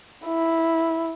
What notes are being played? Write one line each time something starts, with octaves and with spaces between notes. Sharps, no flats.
E4